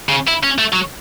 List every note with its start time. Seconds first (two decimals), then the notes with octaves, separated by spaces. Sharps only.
0.09 C#3
0.28 E4
0.43 C#4
0.58 A3
0.73 F#3